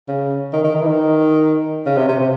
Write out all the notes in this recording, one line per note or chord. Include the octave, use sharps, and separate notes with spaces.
C#3
D#3
D#3
D#3
E3
D#3
C#3
C3
C3
C3